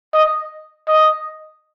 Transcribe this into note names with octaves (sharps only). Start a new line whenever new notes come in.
D#5
D#5